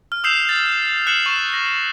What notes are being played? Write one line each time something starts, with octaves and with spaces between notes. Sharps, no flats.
F6
D#6 E6 G6 C7 E7 F7
A6
F#6 C7 C#7 E7 F#7
C#6 E7
A#6